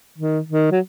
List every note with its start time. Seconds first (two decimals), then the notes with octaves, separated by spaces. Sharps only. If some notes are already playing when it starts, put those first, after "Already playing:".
0.18 D#3
0.49 D#3
0.72 F#3